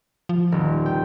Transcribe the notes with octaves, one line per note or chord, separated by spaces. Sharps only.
F3
D#1
G5